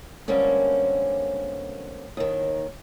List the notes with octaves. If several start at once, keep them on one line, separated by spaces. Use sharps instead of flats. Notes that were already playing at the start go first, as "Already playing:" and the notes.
D3 G3 G#3 A#3 C4 C#4
D#2 D#3